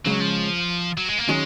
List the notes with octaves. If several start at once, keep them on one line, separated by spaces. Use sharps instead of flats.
C#3 F#3 G#3 C#4
F3
F#3
G#3
A#3
D#3 F#3 G#3 C#4 G#4